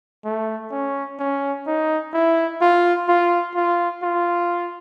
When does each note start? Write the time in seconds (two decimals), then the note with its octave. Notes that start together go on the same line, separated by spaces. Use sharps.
0.25 A3
0.71 C#4
1.19 C#4
1.67 D#4
2.13 E4
2.61 F4
3.09 F4
3.55 F4
4.03 F4